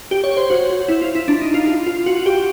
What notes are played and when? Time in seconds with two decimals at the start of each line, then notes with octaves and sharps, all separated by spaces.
0.11 G4
0.24 C#5
0.37 C5
0.50 F#4
0.70 F#4
0.88 E4
1.02 F4
1.15 E4
1.28 D4
1.41 D#4
1.54 F4
1.67 F4
1.87 F4
2.06 F#4
2.26 G4